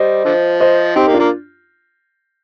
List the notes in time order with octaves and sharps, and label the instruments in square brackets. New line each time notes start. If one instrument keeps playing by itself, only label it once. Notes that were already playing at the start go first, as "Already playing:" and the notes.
Already playing: [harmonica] G3 [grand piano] C5 D#5
[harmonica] D3 F3
[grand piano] C5 D#5
[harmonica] C4 [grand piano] D#4 G4
[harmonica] A#3
[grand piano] D4 F4
[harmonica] A#3